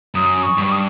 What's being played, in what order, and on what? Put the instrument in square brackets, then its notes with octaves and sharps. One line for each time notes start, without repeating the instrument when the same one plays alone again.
[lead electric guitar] F#2 [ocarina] D#6
[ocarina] C#6
[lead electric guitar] G2
[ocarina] C#6
D#6